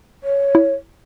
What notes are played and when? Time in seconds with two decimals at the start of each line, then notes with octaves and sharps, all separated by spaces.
0.24 C#5
0.55 E4